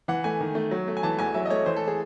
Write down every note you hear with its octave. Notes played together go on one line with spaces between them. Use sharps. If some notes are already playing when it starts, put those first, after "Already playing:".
E3 F#5
A3 G#5
D#3
A3
F#3
A3
G#5
E3 A5
E2 G#5
F#3 E5
D#5
A3 C#5
E3 C5
A4
G#4